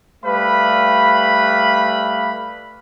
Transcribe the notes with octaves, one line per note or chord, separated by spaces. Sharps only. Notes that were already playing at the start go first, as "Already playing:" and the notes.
G3 A3 B4 F5 B5